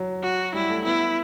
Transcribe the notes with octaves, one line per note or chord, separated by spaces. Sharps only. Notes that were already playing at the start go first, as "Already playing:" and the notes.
Already playing: F#3
F#4
G3 E4
A3
B3 E4